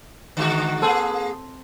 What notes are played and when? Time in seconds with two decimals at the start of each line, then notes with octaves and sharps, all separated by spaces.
0.37 D3 G#3 F#4
0.82 A#3 C4 G#4 A4